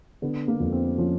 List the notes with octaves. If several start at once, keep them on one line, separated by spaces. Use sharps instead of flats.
D3 B3
A#3
F2
C4
F3 C#4